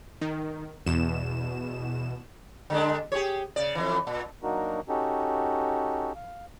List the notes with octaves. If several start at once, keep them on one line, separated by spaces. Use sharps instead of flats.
D#3
E2 B2 E7
D3 G#3 D4
G4 G#4 C#5
C#3 D5
F2 E3
A#2
F#3 A#3 D4 D#4 F#4 A#4
C#4 D#4 F#4 G4 A4
F5